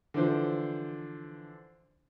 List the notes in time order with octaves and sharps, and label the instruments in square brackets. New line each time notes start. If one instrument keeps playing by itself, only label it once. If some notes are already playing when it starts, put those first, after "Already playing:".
[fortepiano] D3 E3 F3 D4 C5